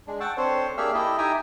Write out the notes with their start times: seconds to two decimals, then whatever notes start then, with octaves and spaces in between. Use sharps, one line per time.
0.07 G#3 D4
0.20 F#5 G5 A5 C#6 E6
0.37 C4 D4 A4 C5 C#5
0.77 A#3 D4 G4 G#4 E5 F6
0.94 E4 G4 A4 D#5 E5
1.18 D#4 G4 E5 G5 G#5 A#5